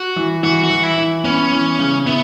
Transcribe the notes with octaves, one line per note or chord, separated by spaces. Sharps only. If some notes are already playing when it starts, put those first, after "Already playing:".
Already playing: F#4
E3
E3 F#4
F#4
E3
E4
E3
B3 C#4
E3
C#3
B3 E4